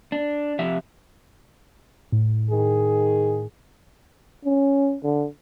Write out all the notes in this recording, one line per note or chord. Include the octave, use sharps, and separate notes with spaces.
D4
C3 F3 G4 E5
A2
D#3 G#4
C#4
D3